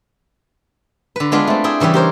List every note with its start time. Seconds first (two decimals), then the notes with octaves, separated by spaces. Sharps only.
1.16 D3 B4
1.32 G#3 B3 D4 F4 B4
1.47 A3 C4
1.64 E4 G#4 G5
1.80 C#3 E3 G3 E4 G4
1.94 G4 A#4 C5 C#5